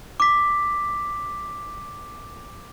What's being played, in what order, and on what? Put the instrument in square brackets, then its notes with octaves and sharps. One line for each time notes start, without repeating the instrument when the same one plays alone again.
[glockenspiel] D6 B6